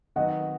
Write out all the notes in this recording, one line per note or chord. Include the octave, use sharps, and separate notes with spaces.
D#3 F#3 B3 F#4 D#5 F#5